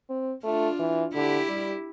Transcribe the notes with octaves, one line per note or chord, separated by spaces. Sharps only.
C4
A3 D4 F4
E3
D3 E4 G4
G3